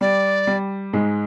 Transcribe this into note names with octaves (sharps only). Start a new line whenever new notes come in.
G3 D5
G3
G#2 G#3